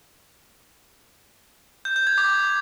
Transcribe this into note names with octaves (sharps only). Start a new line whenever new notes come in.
G6
G6
G#6
D6